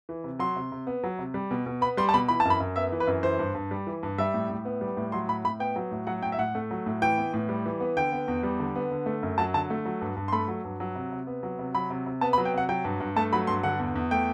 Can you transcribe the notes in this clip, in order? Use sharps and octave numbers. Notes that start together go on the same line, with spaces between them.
E3
C3
F#3 C6
C3
C3
B3
F#3
C3
G3
B2
B2
B3 B5
G3 C6
A5
B2 B5
E3 B5
A5
F#2
B5
F#2
B3 E5
E3
B4
F#2
E3 C5
G2
G2
G3
E3
G2
G3 E5
A2
A2
B3
G3
A2
F#3 C6
A2 B5
A2 B5
B3 G5
F#3
A2
F#3 F#5
A2 G5
E5
A2 F#5
A3
F#3
A2
E3 G5
B3
A2
G3
E3
B3
D3 G5
B3
E2
G3
D3
B3
D3
A3
F#2
F#3 A5
D3 A5
A3
F#3
G2
G2
C6
A3 B5
F#3
G2
F#3
C3
C3
B3
F#3
C3
F#3 B5
C3
C3
B3 A5
B5
F#3
G5
C3 F#5
F#3 G5
G2
G2
A3 A5
F#3 B5
G2 C6
D3 F#5
E2
E2
A3 G5